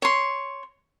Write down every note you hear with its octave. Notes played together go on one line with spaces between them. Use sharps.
C#5 C6